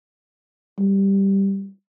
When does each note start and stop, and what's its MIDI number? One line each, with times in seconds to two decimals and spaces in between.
0.79 1.69 55